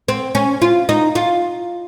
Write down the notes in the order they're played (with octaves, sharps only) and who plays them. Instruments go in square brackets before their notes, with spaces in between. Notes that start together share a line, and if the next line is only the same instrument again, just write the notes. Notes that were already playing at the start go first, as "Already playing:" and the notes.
[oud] C4
C#4
F4
D#4
F4